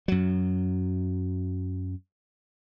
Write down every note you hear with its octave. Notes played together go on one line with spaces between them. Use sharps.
F#2 F#3